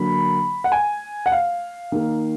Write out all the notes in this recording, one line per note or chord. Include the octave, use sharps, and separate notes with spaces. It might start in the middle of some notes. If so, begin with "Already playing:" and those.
Already playing: D3 F#3 A#3 B5
F#5
G#5
F#5
F5
D#3 A#3